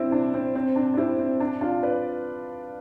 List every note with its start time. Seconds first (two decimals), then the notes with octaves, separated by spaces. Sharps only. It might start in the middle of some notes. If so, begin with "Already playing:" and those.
Already playing: C4 D4 E4
0.12 D4
0.34 C4
0.55 C4
0.76 D4
0.94 D4
0.97 C4 E4
1.19 C4
1.40 D4
1.61 D4 F4
1.83 B4 D5